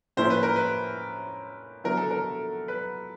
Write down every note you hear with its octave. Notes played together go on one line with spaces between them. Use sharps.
A2 F3 A#3 C#4 E4 C5
B4
A#4
B4
D3 F#3 B3 E4 A#4
A4
A#4
B4